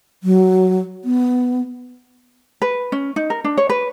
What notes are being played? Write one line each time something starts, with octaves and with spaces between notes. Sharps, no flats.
F#3
B3
B4
C#4
D#4
A#4
D4
C#5
B4